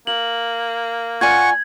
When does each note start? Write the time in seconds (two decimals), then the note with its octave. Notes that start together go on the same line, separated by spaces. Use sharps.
0.07 A#3 F#7
1.21 F4 D5 F#5 G#5 C#6 G#6